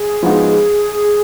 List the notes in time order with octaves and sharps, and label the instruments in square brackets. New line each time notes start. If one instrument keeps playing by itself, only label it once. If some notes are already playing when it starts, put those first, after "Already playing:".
Already playing: [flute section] G#4
[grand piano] F3 G#3 B3 D#4 F#4